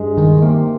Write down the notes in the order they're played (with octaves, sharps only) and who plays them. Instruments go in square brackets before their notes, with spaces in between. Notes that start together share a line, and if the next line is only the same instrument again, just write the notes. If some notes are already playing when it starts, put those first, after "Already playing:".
Already playing: [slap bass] G2 [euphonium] G#3
[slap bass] D#3
[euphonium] C3 [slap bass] A#3